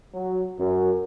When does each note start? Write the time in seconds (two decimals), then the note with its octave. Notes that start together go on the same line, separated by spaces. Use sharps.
0.13 F#3
0.60 F#2